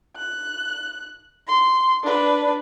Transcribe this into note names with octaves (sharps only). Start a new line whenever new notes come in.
F#6
C6
D4 B4